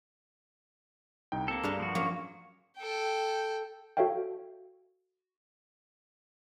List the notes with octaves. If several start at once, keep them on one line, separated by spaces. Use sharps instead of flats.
C2 D#4 G5
A#3 C4 A4 C#7
G2 D4 G#4 A#4 B4 F5
F3 F#4
F#3 A#3 C#4
A4 G5
F#4 A4 C#5 E5 F5 G5